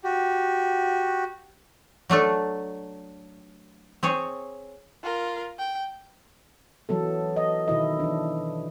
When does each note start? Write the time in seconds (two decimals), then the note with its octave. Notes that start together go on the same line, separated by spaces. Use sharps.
0.04 F#4 G4
2.09 F#3 A3 D4 A4
4.03 C4 G#4 C#5
5.04 F4 A#4
5.59 G5
6.89 E3 F#3 B3 A4
7.36 D#5
7.68 B2 D#3 E4 D#5
8.00 E3 D4